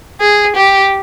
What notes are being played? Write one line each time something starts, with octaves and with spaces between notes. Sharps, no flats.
G#4
G4